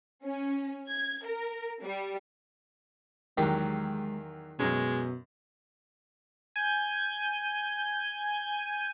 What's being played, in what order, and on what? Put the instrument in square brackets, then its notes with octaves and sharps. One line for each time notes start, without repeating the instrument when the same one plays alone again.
[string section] C#4
G#6
A#4
G3
[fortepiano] E2 F#3 [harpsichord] D#3 G4 [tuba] G#3
[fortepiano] F#2 C#4 [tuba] B2 [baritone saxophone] G#3
[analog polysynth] G#5 G6